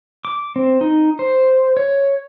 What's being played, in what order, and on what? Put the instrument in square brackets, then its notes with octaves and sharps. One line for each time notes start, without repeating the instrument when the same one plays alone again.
[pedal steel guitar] D6
C4
D#4
C5
C#5